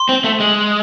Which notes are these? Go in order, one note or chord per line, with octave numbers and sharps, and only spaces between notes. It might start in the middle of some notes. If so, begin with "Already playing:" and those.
Already playing: C6
C4
A3
G#3